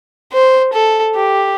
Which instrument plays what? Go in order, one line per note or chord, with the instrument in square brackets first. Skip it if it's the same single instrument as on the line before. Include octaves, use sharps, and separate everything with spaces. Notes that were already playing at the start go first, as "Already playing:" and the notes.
[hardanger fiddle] C5
A4
G4